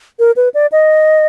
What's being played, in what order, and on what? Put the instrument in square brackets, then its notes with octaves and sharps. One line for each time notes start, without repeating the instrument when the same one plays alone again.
[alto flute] A#4
B4
D5
D#5